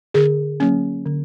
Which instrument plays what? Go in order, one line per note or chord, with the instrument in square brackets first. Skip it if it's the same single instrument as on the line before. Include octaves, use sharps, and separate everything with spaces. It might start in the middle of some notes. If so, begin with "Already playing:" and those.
[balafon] D3 G#4
F#3 A#3 C#4
D3